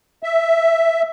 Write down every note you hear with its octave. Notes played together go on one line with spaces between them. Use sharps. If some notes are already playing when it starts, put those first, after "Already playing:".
E5